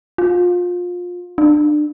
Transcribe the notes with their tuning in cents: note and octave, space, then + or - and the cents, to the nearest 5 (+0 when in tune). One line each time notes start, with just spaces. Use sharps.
F4 +25
D4 +30